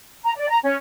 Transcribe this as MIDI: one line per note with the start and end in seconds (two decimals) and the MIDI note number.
0.23 0.31 82
0.36 0.48 74
0.49 0.58 82
0.63 0.74 61